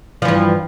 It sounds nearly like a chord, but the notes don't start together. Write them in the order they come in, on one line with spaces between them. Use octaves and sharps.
F3 E3 G2